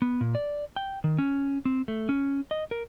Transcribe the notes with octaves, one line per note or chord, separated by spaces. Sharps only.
B3
A#2
D5
G5
D#3
C#4
C4
A3
C#4
D#5
A#4